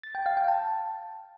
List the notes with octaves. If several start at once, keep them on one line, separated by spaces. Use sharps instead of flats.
A6
G5
F5
G5
A5